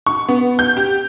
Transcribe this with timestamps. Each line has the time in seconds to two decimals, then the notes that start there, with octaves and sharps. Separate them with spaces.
0.06 C#6
0.29 B3
0.59 G6
0.77 G4